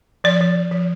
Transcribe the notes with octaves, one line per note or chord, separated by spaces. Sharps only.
F3 D5
F3
F3
F3